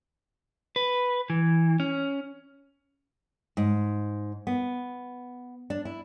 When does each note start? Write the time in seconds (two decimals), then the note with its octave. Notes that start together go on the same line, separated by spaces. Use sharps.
0.76 B4
1.30 E3
1.80 C#4
3.57 G#2
4.47 B3
5.70 D4
5.85 E4